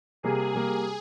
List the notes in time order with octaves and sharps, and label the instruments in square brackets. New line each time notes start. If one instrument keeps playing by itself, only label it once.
[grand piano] C3 G3 A#3 [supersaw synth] G#4
[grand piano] C3 G3 A#3